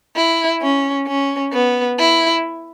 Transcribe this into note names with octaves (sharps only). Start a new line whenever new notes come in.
E4
C#4
C#4
B3
E4